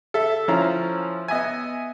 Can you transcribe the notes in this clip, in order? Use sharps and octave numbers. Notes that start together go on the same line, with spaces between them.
A4 E5
F3 C#4 E4 F5 A#5
B3 D#5 E5 G#5